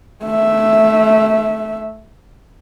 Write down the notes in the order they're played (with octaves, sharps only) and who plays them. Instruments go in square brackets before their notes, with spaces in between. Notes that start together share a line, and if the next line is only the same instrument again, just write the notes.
[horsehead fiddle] A3 E5